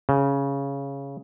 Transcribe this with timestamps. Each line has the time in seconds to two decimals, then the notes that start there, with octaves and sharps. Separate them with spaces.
0.09 C#3